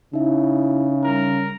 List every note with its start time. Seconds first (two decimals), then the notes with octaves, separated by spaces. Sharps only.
0.13 C#3 D#4 E4 E5
1.04 G3 A#4